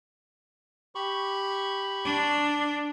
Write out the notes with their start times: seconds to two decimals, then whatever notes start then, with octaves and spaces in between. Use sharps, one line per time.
0.95 G4 B5 C#6
2.05 D4